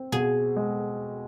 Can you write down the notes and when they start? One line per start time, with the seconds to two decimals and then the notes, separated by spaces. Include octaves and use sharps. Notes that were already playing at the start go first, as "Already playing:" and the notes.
Already playing: C4
0.12 B2 G#4
0.56 G#3